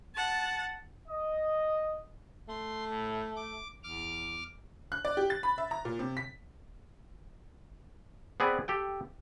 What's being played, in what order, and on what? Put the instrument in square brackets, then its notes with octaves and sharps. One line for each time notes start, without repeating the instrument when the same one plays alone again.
[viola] F#5 A5
[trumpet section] D#5
[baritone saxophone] A3 [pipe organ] C6
[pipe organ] A2
D6
[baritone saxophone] E2 [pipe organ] D6 F6
[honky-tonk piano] F#6
D5
G4
A6
B5
E5
A#5
A#2
C3
B6
[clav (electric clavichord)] B3 C4 G#4 B4 D5
G4 A4 G5